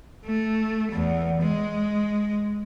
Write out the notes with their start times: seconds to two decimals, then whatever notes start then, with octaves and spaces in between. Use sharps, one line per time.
0.25 A3
0.91 E2
1.40 G#3